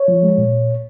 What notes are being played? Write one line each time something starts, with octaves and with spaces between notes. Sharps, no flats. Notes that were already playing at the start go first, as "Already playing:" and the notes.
Already playing: C#5
F3
G#3
A#2